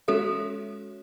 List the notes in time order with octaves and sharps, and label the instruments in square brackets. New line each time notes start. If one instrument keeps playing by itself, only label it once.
[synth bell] G#3 C#4 F#4 C#5 E5 [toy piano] A4